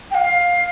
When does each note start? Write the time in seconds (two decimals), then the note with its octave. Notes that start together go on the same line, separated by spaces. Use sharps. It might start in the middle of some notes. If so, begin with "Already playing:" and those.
0.11 G5
0.15 F5